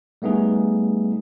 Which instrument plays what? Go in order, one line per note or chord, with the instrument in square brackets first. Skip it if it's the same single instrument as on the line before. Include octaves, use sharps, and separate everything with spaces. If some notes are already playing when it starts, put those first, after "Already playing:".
[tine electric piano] G3 A3 B3 D#4 G#4